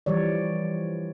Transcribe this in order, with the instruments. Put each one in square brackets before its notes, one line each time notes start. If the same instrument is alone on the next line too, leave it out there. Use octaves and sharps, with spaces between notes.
[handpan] E3 F3 G3 C#5 D5